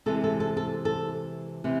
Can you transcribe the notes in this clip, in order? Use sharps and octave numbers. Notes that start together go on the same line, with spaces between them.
C3 E3 G#3 A4
A4
A4
A4
A4
C3 E3